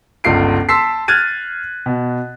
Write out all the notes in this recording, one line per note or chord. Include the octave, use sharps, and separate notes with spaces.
G1 C#2 F4 C7 D7
A5 C6 E6 B6 C7
F6 F#6 G#6 A6 D#7
B2